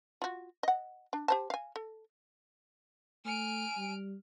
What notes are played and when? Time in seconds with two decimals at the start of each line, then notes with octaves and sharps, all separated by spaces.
0.22 F4 F#4
0.63 D#5 F#5
1.13 D4
1.28 G4 C5 A5
1.50 F5 G#5
1.76 A4
3.25 A3 G#5 F6 D7
3.77 G3